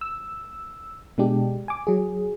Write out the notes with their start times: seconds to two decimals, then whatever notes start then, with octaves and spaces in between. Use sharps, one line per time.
0.01 E6
1.18 B2 G#3 D4 G4
1.68 G#5 D6
1.87 F#3 G#4